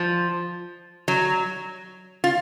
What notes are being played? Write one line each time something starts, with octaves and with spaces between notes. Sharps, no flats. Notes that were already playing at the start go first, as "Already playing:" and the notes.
Already playing: F3
F#3
F4